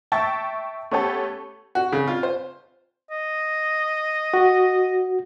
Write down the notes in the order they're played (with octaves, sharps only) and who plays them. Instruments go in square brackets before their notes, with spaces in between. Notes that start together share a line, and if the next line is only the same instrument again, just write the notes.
[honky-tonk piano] E5 G5 A5 C#6 E6 A6
A3 B3 C#4 G4 A4
[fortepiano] F#4
C#3
F4
C5
[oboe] D#5
[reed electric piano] F#4